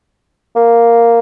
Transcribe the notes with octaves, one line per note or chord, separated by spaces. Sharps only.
A#3